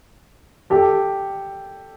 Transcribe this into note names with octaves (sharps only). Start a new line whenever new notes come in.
G4 A4